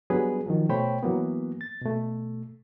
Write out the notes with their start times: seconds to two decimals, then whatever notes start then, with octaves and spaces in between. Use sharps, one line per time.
0.10 F#3 G3 B3 D4 G#4 B4
0.47 D#3 F3 F#3
0.69 B2 A3 C5 C#5 G5 B5
1.03 E3 F#3 A#3 B3
1.61 A6
1.82 B2 A3